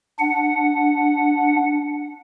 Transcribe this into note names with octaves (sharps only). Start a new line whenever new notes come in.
D4 F#5